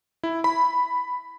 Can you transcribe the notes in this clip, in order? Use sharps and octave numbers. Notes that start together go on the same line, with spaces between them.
E4
B5